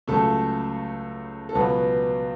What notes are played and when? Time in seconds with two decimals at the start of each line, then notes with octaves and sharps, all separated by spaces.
0.08 C#2 C#3 F#3 A3 A4
1.49 A4
1.55 C#2 B2 F#3 B3 B4